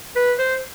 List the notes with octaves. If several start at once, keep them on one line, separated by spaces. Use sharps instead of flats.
B4
C5